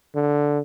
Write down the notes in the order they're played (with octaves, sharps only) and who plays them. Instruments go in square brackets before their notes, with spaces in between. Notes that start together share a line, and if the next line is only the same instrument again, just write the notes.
[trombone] D3